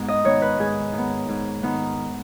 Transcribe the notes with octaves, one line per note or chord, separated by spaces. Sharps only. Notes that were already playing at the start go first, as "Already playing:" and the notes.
Already playing: G#2 B3
D#5
D#3 B3 C#5
B4
G#2 G#4
D#3 B3
G#2
D#3 B3